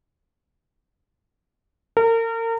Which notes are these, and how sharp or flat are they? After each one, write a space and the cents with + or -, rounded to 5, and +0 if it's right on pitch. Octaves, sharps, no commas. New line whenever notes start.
A#4 -35